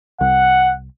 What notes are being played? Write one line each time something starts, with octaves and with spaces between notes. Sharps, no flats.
C2 F#5